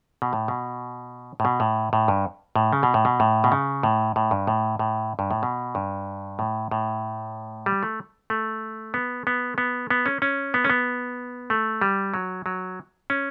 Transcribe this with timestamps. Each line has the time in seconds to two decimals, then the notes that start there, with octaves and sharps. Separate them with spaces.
0.22 B2
0.33 A2
0.48 B2
1.40 A2
1.45 B2
1.60 A2
1.93 A2
2.08 G2
2.56 A2
2.73 C#3
2.83 B2
2.94 A2
3.05 B2
3.20 A2
3.44 B2
3.52 C#3
3.83 A2
4.16 A2
4.31 G2
4.47 A2
4.79 A2
5.19 G2
5.31 A2
5.43 B2
5.75 G2
6.39 A2
6.71 A2
7.66 G3
7.83 A3
8.30 A3
8.94 B3
9.27 B3
9.58 B3
9.90 B3
10.06 C#4
10.22 C#4
10.54 B3
10.64 C#4
10.70 B3
11.50 A3
11.81 G3
12.14 F#3
12.46 F#3
13.10 C#4